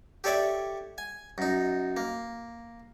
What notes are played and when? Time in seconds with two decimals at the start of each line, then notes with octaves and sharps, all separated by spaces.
0.24 G4 A4 C#5 D5 E5
0.98 G#5
1.38 F#2 D#4
1.97 A#3